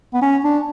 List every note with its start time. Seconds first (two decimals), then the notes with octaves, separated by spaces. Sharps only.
0.14 B3
0.22 C#4
0.44 D4